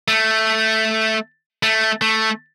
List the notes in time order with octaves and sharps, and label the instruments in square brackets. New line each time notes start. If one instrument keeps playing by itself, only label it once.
[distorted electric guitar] A3
A3
A3